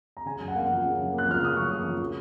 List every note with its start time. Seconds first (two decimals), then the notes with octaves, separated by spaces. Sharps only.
0.17 A#5
0.25 C#3 G#5
0.40 F#2
0.48 F#5
0.55 A#3 F5
0.65 F3 F#5
0.85 C#3
0.98 F#2
1.13 A#3
1.18 F#6
1.27 F3 F6
1.42 C#3 D#6
1.56 F#2 C#6
1.71 A#3
1.85 F3
2.00 C#3